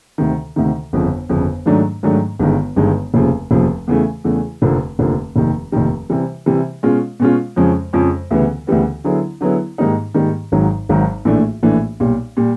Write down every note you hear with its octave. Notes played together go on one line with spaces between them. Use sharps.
D2 C3 D#3
D2 C3 D#3
G1 F2 C#3
G1 F2 C#3
G#2 D#3 F#3 A3 D4
G#2 D#3 F#3 A3 D4
G1 G2 D#3 G#3
G1 G2 D#3 G#3
F1 D#2 C#3 F3
F1 D#2 C#3 F3
E2 C#3 E3 A3
E2 C#3 E3 A3
F1 D#2 D3 F3 A#3
F1 D#2 D3 F3 A#3
F1 D#2 D#3 G3
F1 D#2 D#3 G3
C3 E3 G3
C3 E3 G3
B2 G#3 C#4 F4
B2 G#3 C#4 F4
F2 C#3 F3 G#3 C#4
F2 C#3 F3 G#3 C#4
D2 C#3 E3 G3 B3
D2 C#3 E3 G3 B3
D3 F#3 B3 E4 G#4
D3 F#3 B3 E4 G#4
G#2 D#3 G3 A#3 D#4
G#2 D#3 G3 A#3 D#4
G#1 G#2 D#3 F#3
G#1 G#2 D#3 F#3
A#1 A2 E3 A3 D4
A#1 A2 E3 A3 D4
B1 A#2 G3
A#2 G3